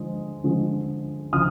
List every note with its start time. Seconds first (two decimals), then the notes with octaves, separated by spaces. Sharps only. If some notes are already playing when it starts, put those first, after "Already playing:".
Already playing: D3 F3 G#3
0.44 D3 F3 G#3
1.33 D3 F3 D#6 F6